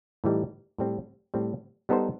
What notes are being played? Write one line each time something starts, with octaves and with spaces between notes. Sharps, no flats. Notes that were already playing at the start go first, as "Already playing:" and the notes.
A2 E3 G3 D#4
A2 G3 C4
A2 G3 C4
G3 B3 D#4 A4 C5